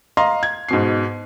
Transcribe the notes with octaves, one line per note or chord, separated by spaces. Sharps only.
D#5 F5 A#5 C6
G#6
G#2 B2 C7